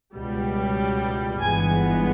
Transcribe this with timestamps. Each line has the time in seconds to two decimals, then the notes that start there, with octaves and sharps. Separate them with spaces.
0.14 C#2 B2 G3
1.41 G1 G2 E3 G#3 B3 G#5